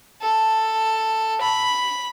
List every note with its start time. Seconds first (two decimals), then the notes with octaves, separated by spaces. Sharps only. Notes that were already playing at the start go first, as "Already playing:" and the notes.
0.22 A4
1.41 B5